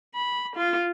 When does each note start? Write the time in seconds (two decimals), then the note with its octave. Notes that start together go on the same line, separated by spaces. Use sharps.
0.15 B5
0.56 F4